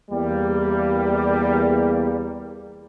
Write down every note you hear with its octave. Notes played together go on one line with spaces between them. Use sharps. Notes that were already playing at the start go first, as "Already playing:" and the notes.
E2 G3 A#3